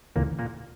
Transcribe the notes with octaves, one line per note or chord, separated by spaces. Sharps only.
D2 A#2 C#3 E3 A#3
A#2 A#3